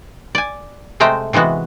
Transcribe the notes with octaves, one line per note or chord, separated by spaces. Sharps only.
D5 G#5
C3 G#3 A3 C5 G5 A#5
C3 E3 G#3 B3 F#4